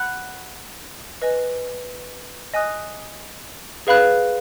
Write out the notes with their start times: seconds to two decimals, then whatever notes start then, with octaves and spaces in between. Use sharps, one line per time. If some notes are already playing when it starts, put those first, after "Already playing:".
Already playing: F#5 B5 F#6
1.22 B4 D#5 G#5
2.54 D#5 G#5 D#6 F#6
3.87 G#4 B4 F5 B5 F#6